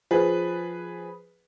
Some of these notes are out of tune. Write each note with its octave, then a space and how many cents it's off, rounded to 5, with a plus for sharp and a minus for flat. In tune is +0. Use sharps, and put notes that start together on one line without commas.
F3 +0 G#4 +0 B4 +0